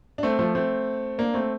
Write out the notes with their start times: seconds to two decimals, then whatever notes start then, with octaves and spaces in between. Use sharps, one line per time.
0.18 D4
0.23 A3 C4
0.39 F3 A3
0.55 A3 C4
1.18 A#3 D4
1.34 A3 C4